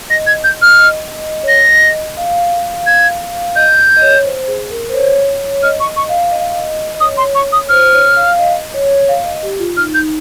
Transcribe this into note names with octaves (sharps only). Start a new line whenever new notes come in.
D#5 A#6
G#6
G6
F6
D#5
C#5
D#5 A#6
F5
G#6
D#5 G6
D#5
C#5
C5
G#4
A#4
C5
C#5
D#5 F6
C#6
D#5
C#6
F5
D#5
F5
D#5
D#5
C#5 D#6
C6
C#6
D#6
C5 F6
C#5
F5
F5
D#5
C#5
F5
D#5
G4
F4
D#4 F6
G6